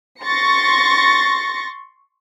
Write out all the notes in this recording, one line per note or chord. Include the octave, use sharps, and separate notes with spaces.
C6 C#6 A6 A#6 C#7